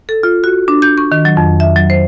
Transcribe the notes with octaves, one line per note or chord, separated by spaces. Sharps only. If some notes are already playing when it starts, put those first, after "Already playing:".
A4
F4
F#4
D4
G6
C#6
D#3
F#3
F2
E5
F#3
C5